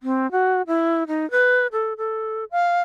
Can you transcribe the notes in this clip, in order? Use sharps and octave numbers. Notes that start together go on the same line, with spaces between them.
C4
F#4
E4
D#4
B4
A4
A4
F5